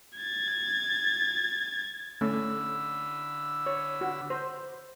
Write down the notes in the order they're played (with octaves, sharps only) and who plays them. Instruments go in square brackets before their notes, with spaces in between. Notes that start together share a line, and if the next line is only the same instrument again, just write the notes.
[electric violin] G#6 A6
[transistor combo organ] D3 B5 E6 [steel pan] A3 C#4
[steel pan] C#5
F#4
C5